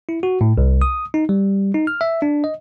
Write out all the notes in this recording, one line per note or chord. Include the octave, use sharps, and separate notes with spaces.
E4
F#4
A2
C2
D#6
D#4
G3
D#4
F6
E5
D4
D#5